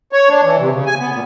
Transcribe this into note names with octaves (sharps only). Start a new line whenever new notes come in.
C#5
D4
E3
C3
C#3
G#5
B3
A#2